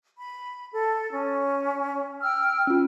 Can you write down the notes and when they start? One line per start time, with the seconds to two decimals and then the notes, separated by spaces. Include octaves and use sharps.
0.16 B5
0.70 A4
1.10 C#4
2.21 G5 E6 F6
2.67 C#4 F4